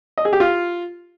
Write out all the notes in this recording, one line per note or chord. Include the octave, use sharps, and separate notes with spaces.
D#5
G#4
G4
F4